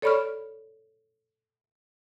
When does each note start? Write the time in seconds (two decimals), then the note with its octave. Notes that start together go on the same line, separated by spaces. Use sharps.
0.02 A4 C#5 D5 B5 C#6 F6